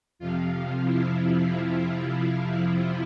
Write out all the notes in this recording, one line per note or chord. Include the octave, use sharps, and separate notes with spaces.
F2 C3 F3 F4
E4
E4